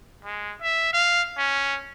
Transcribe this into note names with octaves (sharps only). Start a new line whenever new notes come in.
G#3
E5
F5
C#4